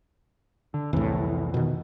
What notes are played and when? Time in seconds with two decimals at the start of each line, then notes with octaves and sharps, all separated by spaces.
0.74 D3
0.93 C2 F2 A2 E3
1.54 B2 D#3